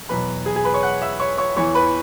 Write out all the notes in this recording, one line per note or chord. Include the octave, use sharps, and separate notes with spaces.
E2 B2 F#3 B4 B5
G#4 G#5
G#4 G#5
B4 B5
C#5 C#6
F#5 F#6
E5 E6
C#5 C#6
C#5 C#6
E2 E3 C#5 C#6
B4 B5